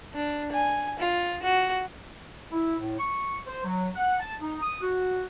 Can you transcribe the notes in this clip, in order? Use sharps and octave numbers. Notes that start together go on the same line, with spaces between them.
D4
G#5
F4
F#4
E4
A2
C#6
C5
F#3
F#5
A5
D#4
D#6
F#4